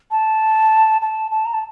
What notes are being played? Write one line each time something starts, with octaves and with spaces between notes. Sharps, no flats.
A5
A5
A5
A#5
A5